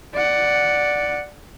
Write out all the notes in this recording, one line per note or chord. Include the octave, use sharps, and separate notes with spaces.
D5 F#5